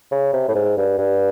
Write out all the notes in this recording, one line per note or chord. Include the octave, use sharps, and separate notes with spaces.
C#3
C3
A2
G#2
G2
G2